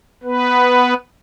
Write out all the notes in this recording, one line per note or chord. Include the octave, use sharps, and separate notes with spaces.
B3 B4